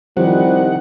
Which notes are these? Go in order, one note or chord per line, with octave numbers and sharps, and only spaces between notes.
C2 D#3 F3 G3 F#5